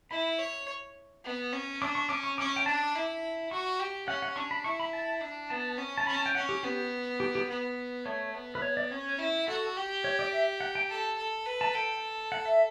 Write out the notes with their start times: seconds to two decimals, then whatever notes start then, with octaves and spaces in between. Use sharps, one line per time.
0.10 E4 B5
0.39 C#5
1.24 B3
1.53 C#4
1.81 D4 D6
1.95 C#6
2.09 C#4 D6
2.23 C#6
2.38 C#4 D6
2.47 C#6
2.56 G5
2.66 D4 A5
2.81 D6
2.95 E4
3.51 F#4 C#6
3.80 G4
4.08 C#4 F#5
4.22 F#5
4.36 D4 C#6
4.51 B5
4.64 E4 C#6
4.80 B5
4.93 A5
5.21 D4
5.50 B3 A5
5.78 C#4
5.98 A5
6.07 C#4 B5
6.16 A5
6.26 G5
6.35 C#4 F#5
6.49 G4
6.63 B3 G4
7.20 G4
7.35 G4
7.48 B3 B4
8.05 A3 C#5
8.34 B3
8.55 B4
8.62 C#5
8.77 D5
8.91 C#4 C#5
9.19 E4
9.48 F#4 A4
9.77 G4
10.04 C#5
10.19 D5
10.32 E5
10.60 F#5
10.75 G5
10.89 A4 A5
11.18 A4
11.46 B4
11.61 A5
11.74 A4 G5
12.32 F#5
12.45 E5